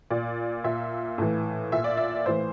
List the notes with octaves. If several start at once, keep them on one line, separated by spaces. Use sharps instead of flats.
A#2 D5
A#2 E5
A2 E3
A#2 E5
D5
E5
A2 E3 C5